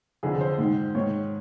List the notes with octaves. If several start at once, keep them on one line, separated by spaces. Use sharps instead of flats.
F2 D3 F3 G#4
C5
G#2 D#3
G#2 D#3 C#5